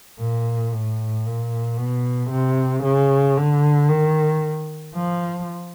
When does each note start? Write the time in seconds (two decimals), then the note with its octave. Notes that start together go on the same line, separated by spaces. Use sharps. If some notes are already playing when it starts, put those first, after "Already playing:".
0.19 A#2
0.73 A2
1.26 A#2
1.78 B2
2.31 C3
2.84 C#3
3.37 D3
3.89 D#3
4.95 F3